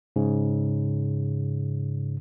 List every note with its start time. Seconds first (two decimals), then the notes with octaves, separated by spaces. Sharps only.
0.16 G#2 C#3